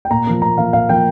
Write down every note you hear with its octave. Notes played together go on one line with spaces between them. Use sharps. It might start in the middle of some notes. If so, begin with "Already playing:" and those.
G5
A#2 A#5
F3 A#3
A#2 A#5
F3 A#3 F5
A#2 F5
F3 A#3 G5